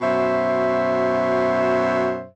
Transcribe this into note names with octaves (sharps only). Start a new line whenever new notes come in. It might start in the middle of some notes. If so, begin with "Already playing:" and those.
F#2 B2 C5 E5